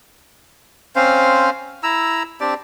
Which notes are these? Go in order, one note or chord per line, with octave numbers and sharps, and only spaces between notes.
C4 C#4 C5 F5
E4 A#5 E6
C4 D4 G4 D5